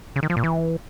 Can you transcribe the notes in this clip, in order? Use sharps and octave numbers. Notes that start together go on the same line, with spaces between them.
C#3
D#3
F3
A#2
E3